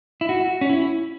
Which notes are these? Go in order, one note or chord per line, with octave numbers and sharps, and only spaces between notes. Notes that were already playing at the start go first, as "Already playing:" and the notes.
E4
F#4
C#4
E4